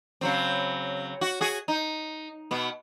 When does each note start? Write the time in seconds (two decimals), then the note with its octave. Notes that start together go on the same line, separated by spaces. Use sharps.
0.21 C#3 F#3 C4
1.21 F#4
1.41 F#4 G#4
1.68 D#4
2.51 B2 B3